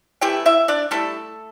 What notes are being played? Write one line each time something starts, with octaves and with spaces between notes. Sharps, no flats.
E3 A3 E4 G4 G5
E4 E5
D4 D5
G3 A3 E4 A4